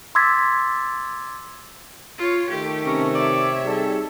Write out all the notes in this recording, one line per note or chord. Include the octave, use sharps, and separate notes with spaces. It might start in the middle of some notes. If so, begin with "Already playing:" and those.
C6 D6 E6 G#6 A6 B6
F4 C#5
D#3 A3 G4
C3 C#4 A#5
C#5 D5 E5
G3 D#4 G#4 A4